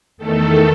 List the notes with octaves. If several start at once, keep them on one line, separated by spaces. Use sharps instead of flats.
E2 D#3 A3 A4